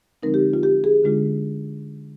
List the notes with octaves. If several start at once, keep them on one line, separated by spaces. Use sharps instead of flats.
D3 F3 G#3 C4 D#4 A#4
G4
F4
G4
G#4
D3 G#3 D4 F4